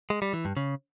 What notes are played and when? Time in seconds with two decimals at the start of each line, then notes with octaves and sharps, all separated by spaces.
0.10 G#3
0.22 G3
0.33 E3
0.45 G2
0.57 C#3